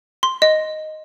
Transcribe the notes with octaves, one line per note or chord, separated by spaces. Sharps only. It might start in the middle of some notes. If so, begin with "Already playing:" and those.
C6
D#5